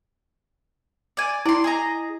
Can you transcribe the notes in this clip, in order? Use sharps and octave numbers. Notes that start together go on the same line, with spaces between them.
D5 G#5
E4 D5 C6
G#4 D#5 A#5